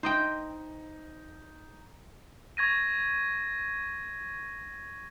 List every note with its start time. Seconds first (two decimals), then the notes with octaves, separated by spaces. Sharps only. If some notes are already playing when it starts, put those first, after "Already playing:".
0.03 D#4 C5 D#5 G5
2.57 C#6 G#6 A#6 D#7